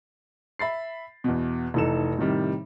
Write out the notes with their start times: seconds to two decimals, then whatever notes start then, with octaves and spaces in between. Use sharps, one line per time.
0.59 E5 B5 A6 C7
1.24 E2 B2
1.74 F1 E3 D#4 A4 E7
2.18 A2 C3 D#3 G3